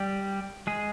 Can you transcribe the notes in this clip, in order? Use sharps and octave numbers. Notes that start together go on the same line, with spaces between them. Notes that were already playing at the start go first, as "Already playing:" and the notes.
Already playing: G3 G4
G#3 G#4